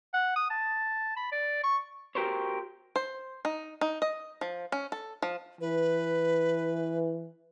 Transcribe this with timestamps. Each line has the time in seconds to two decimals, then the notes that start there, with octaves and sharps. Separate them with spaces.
0.14 F#5
0.36 D#6
0.50 A5
1.16 B5
1.32 D5
1.64 C#6
2.15 F#4 G4 A#4 C5 C#5
2.96 C5
3.45 D#4
3.81 D#4
4.02 D#5
4.41 F3
4.72 C#4
4.92 A4
5.22 F3
5.61 E3 B4